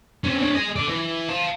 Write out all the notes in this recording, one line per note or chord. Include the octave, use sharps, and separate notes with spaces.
C4 C#4
D4 C#5
G#4 D#5
A4 D5
E3
F5 A5